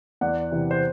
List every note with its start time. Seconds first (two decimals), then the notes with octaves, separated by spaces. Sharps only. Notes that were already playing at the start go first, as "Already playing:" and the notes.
0.21 E2 D5 F#5
0.51 C3 E3
0.71 C5